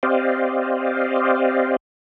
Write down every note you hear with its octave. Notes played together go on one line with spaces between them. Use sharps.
C4 G4 C5 D5 D#5 F5